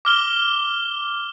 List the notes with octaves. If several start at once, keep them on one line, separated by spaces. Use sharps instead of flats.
D6 F6 G7